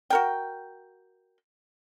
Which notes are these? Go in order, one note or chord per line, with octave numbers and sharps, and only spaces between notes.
F#4 A#4 G5